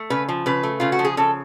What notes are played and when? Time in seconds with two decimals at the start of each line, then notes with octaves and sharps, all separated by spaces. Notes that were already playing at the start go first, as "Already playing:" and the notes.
Already playing: A3
0.10 C#3 B4
0.29 F3
0.46 C#3 B4
0.63 A3
0.80 C#3 F4
0.92 F#4
0.99 F3
1.05 G#4
1.17 C#3 A4